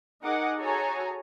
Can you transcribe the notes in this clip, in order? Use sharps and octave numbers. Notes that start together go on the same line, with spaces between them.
D#4 G#4 A#4 D#5 F#5 D6
F#4 G#4 A4 C#5 G#5 A#5